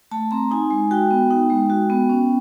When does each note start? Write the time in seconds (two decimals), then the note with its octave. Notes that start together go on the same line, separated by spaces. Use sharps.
0.11 A3 A5
0.31 C4 A#5
0.51 D#4 G#5
0.71 G#3
0.91 F#4 G5
1.11 B3
1.31 D#4
1.50 G#3
1.70 F#4
1.90 B3
2.09 C#4